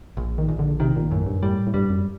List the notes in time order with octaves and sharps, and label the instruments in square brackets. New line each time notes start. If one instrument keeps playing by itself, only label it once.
[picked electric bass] A#1
[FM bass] D#3
[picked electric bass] A#1
[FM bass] D3
[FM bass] C3 [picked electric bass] D#3
[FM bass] A#2
[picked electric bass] F#2 [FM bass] A2
[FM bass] G2
[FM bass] A2 [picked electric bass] G3
[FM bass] A2
[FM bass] G2 [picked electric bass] G3
[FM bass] F#2